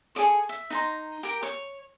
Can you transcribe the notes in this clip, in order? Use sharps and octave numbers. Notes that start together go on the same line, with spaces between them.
G#4 A4 D5 C#6
E5
D#4 A#5 C6
G4 A#4
C#5